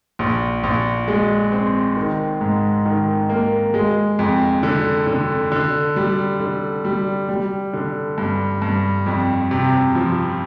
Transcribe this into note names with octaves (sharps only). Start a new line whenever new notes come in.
A#1
A#1
G#3
C4
D#3
G#2
D#3
A#3
G#3
F2
D3
D3
D3
G3
D3
G3
G3
D3
G2
G2
F2
C3
F3